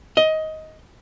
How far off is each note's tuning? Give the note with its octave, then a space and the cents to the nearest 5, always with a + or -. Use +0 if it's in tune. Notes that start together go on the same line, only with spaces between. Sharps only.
D#5 +15